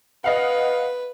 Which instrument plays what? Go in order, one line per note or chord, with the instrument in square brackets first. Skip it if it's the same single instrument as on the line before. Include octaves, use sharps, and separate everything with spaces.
[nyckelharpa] B4 [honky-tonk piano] D#5 F5 F#5